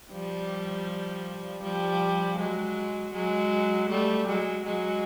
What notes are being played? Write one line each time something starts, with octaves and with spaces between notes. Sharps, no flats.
F3 G3
F3 G3
F#3 G#3
F#3 G#3
G3 A3
F#3 G#3
F#3 G#3